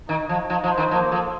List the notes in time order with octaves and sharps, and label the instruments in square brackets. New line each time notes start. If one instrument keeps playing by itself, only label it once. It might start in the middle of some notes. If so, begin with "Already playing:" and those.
[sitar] D#3 [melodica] D#4
[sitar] F3 [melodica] D#4
[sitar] F3 [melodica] D#4
[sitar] F3
[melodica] C5
[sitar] D#3
[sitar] F3 [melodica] A#3
[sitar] F3 [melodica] A4